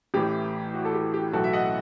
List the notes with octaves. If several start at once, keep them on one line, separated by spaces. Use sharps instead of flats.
A1 A2 E3 G4
F#4
A4
G4
G4
B1 A2 E3 F#4 A4
E5
D#5 F#5